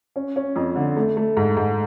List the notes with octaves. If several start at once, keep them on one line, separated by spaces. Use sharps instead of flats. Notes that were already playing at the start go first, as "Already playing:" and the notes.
C#4
C#4
F2
D3
A3
A3
G#2
G#2